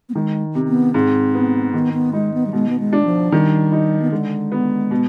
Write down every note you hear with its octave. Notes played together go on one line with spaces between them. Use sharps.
B3
D#3 G#3
C3
B3
G#2 C4
B3
D#3 B3
B3
G#3 D#4
B3
G3
B2 G#3
B3
G#3
D4
F3
D#3 G3
D#4
B3
D3 G#3
B3
B2